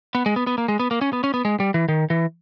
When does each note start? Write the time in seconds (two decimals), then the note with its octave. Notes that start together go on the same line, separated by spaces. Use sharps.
0.15 B3
0.26 G#3
0.36 B3
0.47 B3
0.58 A#3
0.68 G#3
0.79 B3
0.91 A#3
1.01 C#4
1.13 B3
1.24 C#4
1.34 B3
1.45 G#3
1.60 G3
1.74 E3
1.88 D#3
2.10 E3